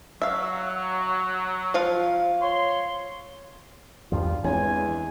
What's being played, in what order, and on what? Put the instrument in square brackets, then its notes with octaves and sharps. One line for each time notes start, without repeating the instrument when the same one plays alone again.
[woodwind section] F#3 [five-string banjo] E5 F5
[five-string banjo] F3 F4 F5
[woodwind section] C#5 C6
[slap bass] E2 G2 F3 [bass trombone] G3 [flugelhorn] F4
[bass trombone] E2 [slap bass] E3 F#3 G#3 [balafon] C4 D4 C#5 [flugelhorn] G#5